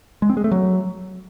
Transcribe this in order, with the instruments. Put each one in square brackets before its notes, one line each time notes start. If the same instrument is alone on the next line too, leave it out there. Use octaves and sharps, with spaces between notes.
[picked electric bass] G#3
C4
G#3
A3
F#3